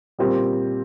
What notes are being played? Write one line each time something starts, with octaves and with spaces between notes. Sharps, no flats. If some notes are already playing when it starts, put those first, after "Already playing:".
A#2 G3 C4 G4